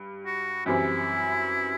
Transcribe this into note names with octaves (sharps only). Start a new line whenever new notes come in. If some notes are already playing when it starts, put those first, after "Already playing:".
Already playing: G2
F#4
F#2 E3 G3 C4 E4